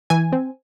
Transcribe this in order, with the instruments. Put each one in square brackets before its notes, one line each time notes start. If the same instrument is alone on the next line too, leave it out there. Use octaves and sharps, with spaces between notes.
[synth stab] E3 G#5
C4